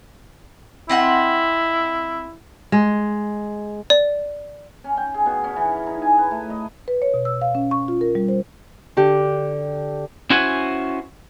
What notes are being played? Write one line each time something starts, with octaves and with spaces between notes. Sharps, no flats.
C4 E4 D#5 F#5
G#3
D5
C#4
G5
G#4
B2
C#4
E3
D#4
G#5
B4
A3
D#5
B4
C#5
B2
E6
F5
C#4
C#6
F4
A#4
G3
C5
D3 G4
C#4 E4 F#4 C5 F#5 G#5